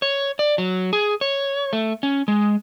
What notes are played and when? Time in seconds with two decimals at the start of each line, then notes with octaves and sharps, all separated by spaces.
0.02 C#5
0.39 D5
0.58 F#3
0.93 G#4
1.21 C#5
1.73 A3
2.03 C#4
2.28 G#3